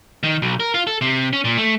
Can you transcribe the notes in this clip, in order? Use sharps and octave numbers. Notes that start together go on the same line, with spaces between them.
D#3
B1
A#4
F4
A4
C3
C#4
A#2
A3